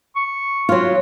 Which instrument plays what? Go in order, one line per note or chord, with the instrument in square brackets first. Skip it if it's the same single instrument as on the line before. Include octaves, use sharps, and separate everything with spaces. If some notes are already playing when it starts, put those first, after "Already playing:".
[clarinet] C#6
[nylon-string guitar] F#3 F4